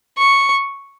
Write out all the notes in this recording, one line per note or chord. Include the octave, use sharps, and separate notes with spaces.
C#6